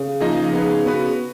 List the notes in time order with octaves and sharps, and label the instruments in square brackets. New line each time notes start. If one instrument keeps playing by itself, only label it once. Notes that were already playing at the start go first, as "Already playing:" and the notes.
Already playing: [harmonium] C#3
[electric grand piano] F3 A#3 D#4 G#4 D#5
B3 D#4 G#4 B4
B3 F#4 B4